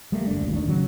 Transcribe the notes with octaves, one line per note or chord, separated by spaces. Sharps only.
G3 A3 A#3
F#1 D4
E1 A1 D2
D#3 D4
C#3 F#3